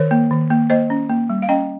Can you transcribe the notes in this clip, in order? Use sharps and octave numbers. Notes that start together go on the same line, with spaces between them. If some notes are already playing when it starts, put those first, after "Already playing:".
Already playing: D#3 A#4 C#5
A#3
D#3
A#3
A#3 C5 D#5
C#4
A#3
G3
F5
C#4 D#5 G5